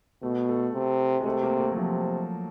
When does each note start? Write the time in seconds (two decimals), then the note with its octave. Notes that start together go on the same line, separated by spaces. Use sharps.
0.22 B2 A3
0.49 A3
0.74 C3
1.21 G#3
1.25 C3 A3
1.43 A#3
1.60 A3
1.71 F#3
1.77 C3 F3